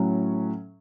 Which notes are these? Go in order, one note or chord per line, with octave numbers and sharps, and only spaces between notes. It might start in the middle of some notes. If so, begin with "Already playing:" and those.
Already playing: A2 F#3 C#4